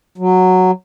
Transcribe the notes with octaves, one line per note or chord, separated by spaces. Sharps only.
F#3